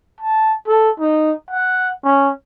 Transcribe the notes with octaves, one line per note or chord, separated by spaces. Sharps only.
A5
A4
D#4
F#5
C#4